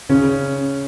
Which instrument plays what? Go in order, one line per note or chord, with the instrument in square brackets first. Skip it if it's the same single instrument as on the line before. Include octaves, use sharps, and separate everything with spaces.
[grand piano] C#3 C#4